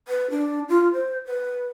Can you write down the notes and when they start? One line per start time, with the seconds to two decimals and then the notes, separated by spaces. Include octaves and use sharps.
0.08 B4
0.30 D4
0.69 F4
0.93 C5
1.26 B4